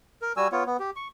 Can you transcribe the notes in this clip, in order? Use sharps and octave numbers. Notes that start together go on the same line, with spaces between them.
A#4
G3 F#4 G#5 E6
B3 F4 C#5
B3
G4
C#6